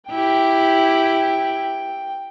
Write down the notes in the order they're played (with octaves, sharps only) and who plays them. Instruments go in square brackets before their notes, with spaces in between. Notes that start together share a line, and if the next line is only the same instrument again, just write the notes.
[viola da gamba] E4 G4 [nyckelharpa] G5